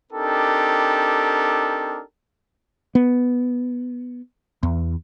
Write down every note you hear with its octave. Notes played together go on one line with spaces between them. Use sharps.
C4 D4 D#4 G4 A4 A#4
B3
E2